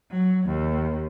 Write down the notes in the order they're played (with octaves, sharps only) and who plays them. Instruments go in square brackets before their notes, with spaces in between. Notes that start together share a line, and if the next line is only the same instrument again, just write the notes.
[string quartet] F#3
D#2